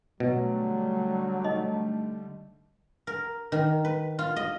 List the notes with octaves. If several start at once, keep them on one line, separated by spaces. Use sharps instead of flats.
B2 D3 F#3 G3 A3
D#4 D#5
A#4
D#3
B4
F4
D#5